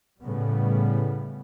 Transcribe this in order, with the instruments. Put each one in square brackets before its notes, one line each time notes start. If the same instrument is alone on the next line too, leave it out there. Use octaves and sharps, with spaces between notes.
[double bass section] A2 C#3 G3 B3